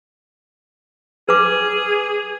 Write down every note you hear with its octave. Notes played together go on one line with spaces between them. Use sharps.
G#4 B4 D6